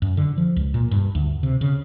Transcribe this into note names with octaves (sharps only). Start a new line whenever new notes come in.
F#2
D3
F3
C#2
A#2
G2
D2
C3
C#3